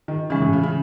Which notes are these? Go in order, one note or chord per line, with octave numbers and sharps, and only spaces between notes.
D#3
C#3 E3 G#3 C#4
A2
C#3
C#3